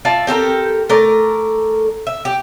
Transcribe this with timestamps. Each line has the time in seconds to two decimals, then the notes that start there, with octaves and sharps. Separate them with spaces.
0.05 F4 D5 E5 A5
0.27 C4 G4 A4 A#4
0.90 A3 A#4 D5
2.07 E5
2.25 G4